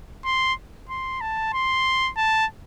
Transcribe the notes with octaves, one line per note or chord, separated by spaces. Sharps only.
C6
C6
A5
C6
A5